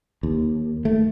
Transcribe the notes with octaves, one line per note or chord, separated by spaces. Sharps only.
D#2
A3